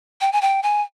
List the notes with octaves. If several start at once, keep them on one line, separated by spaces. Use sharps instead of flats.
G5
G#5
G5
G#5